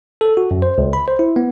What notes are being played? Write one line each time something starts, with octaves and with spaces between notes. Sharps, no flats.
A4
F#4
F#2
C5
C#2
B5
C5
E4
B3